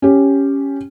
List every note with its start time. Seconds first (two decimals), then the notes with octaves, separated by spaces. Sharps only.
0.02 C#4 G4